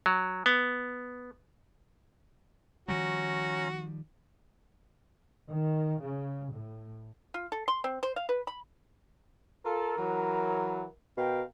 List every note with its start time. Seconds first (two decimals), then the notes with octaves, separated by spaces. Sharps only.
0.06 F#3
0.46 B3
2.88 D#3 F3 G3 C#4 F#4 A#5
5.50 D#3
6.02 C#3
6.53 A2
7.34 F4
7.52 A4
7.68 C6
7.84 C4
8.03 C5
8.16 F5
8.29 B4
8.47 B5
9.65 F4 A4 A#4
9.97 E3 F#3
11.18 B2 A#4 F5 G5